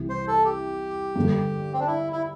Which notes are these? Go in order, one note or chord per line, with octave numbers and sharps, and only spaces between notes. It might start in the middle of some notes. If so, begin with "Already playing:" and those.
Already playing: C2 C3 E3
C5
A4
G4
G2 D3 G3
C4
D4
E4
E4